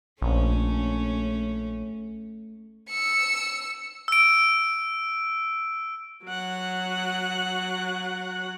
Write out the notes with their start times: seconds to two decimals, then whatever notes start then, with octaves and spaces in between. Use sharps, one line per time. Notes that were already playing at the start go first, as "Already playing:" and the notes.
0.22 A#1 A3 C#4
2.90 E6 C#7
4.08 E6 D7
6.26 F#3 F#5